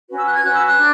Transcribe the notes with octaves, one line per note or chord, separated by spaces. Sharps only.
C#4 F#4 B4
E6
F#6
G#6
C#4 F#4 B4 F#6
E6
F#6
D4